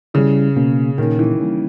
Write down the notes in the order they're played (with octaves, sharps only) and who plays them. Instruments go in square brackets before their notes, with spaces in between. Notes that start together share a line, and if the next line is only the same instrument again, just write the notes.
[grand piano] C#3 [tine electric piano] G3 C#4 E4
[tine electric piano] B2 A#3 C#4
[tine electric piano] A#2 A#3 C#4 [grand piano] D#3
[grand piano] E3
[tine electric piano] G3 A#3 C#4